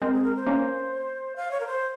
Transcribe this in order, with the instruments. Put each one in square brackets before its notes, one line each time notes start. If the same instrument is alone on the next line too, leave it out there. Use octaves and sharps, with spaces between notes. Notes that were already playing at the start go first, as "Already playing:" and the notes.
[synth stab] G#3 C4 [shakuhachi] A#4
[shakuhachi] G#4
A#4
C5
[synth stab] A#3 C#4
[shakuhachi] F5
C#5
A#4
C5